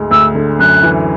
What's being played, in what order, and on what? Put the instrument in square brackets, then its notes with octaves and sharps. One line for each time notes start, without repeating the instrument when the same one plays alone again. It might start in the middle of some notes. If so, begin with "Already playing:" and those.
Already playing: [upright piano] D2 G#2 G#3
[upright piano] D2 [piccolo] E6
[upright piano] D3
[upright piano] F#2 [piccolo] F#6
[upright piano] E3